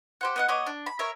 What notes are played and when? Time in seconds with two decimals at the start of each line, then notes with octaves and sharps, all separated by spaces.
0.21 G4 C5 F#5
0.36 B3 D#5 F#5
0.48 B3 C#5 D#5 D6
0.67 D4
0.86 B5
0.99 A#4 C#5 E5